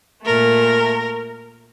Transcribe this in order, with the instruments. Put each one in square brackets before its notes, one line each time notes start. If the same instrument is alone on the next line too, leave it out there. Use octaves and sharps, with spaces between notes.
[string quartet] A#2 A3 A#4